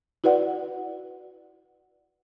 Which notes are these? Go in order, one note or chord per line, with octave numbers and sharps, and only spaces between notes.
E4 F#4 B4 D5 F#5